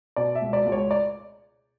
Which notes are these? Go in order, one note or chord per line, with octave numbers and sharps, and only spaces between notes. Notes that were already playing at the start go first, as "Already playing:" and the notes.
B2 D5
E5
C#2
D5
C#2
C#5
D5